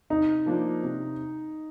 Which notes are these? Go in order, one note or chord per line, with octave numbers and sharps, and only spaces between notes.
C3 D#4
F3 A#3 D4 F4
C3